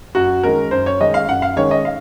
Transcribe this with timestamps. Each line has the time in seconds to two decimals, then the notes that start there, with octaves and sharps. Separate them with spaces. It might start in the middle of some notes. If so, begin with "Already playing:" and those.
0.15 F#2 F#4
0.43 D#3 G#3 C#4 A#4
0.71 F#2 C5
0.86 C#5
1.00 D#3 G#3 C#4 D#5
1.14 F5
1.28 F#2 F#5
1.42 F5
1.56 D#3 G#3 C#4 C#5
1.71 D#5
1.85 F5